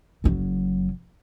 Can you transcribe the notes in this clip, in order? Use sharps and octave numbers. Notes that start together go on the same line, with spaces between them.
F#1 F#3